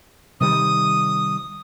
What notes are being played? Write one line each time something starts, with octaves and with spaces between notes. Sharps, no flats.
C3 D#3 G3 D#6